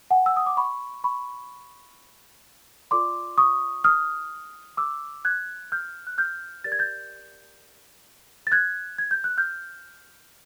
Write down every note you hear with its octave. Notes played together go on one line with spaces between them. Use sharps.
F#5 G#5
E6
D#6
D6
B5 C#6
B5 C#6
F4 A4 D5 C6 D6
C#6 D#6
D#6 F6
D6 E6
F#6 G#6
F6 G6
F#6
F6 G6
G4 A#4 D5 A6
G#6
G6 A6
A6
F#6 G#6
G#6
G6
F#6
F6 G6